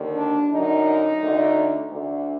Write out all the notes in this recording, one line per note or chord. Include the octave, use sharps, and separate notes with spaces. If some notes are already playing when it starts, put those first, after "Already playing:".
Already playing: D#2 D3
D4
F#2 D3 D#4
D2 D3
D2 D3